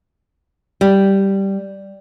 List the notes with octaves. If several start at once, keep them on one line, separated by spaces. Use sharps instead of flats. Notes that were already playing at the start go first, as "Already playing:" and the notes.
G3